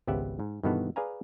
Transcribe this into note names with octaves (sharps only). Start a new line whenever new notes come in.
G#1 C#2 B3 G4 E5 F#5
G#2
G2 B2 D#3 E3 B3 A4
G#4 B4 D5 F5 G#5 A#5